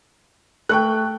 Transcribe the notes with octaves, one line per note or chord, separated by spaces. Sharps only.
A3 G5 C#6 F#6